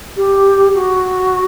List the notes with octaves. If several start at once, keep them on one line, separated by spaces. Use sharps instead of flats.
G4
F#4